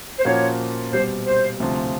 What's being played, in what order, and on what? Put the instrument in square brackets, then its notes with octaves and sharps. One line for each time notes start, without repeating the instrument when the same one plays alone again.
[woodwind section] C5
[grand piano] A#2 F3 A#3 C#4 F#4 [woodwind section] C#5
[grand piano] B2 G3 C4 [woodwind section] C5
[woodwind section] C5
[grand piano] D2 C3 F3